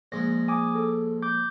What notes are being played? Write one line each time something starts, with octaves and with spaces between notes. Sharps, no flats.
A#1 G#3 A#6
G#5 D6 D#6
A4
D6 G6